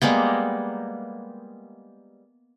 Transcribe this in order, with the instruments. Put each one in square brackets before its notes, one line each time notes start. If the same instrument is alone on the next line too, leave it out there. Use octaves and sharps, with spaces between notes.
[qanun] G3 G#3 A#3 B3